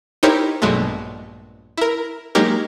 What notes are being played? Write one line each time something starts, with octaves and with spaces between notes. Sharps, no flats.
D#4 E4 G4 A#4 C5 C#5
A#1 G2 B2 F#3 G#3 A3
E4 A#4
F#3 G#3 A#3 D#4 G4 A#4